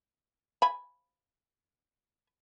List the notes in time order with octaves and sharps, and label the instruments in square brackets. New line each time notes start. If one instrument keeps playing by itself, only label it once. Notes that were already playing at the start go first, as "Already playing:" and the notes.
[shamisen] G#5 B5